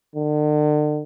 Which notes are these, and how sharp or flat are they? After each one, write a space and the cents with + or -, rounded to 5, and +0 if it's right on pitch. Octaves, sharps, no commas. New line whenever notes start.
D3 +40